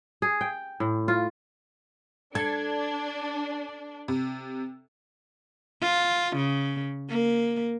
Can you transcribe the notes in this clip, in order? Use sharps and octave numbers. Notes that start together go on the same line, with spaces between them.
G#4
G5
A2
F4
D4 A4 G#6
C3
F4
C#3
A#3